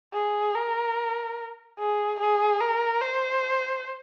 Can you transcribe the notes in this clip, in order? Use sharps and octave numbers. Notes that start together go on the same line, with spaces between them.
G#4
A#4
G#4
G#4
A#4
C5